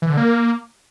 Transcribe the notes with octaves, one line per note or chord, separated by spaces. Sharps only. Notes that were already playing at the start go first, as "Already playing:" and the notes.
E3
D3
A#3